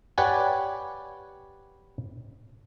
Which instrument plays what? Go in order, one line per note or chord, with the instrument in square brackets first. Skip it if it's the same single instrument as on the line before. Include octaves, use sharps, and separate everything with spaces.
[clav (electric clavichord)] G4 B4 C#5 D5 F#5 G#5